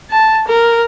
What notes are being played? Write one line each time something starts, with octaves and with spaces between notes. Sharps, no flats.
A5
A#4